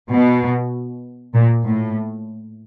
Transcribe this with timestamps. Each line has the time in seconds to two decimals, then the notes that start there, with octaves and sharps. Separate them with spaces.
0.11 B2
1.34 A#2
1.66 A2